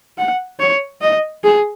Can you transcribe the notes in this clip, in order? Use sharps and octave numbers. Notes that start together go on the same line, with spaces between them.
F#5
C#5
D#5
G#4